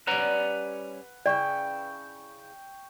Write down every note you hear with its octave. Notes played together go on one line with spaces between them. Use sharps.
G3 C#4 B4 F#5 A#5
C#3 E4 D5 G5 C#6